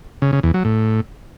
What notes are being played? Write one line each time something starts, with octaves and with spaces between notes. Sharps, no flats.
C#3
C#3
E2
F#3
A2